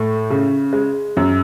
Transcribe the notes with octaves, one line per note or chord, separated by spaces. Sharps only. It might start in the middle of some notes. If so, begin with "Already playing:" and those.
Already playing: A2 A3
C#3
G#3
F#2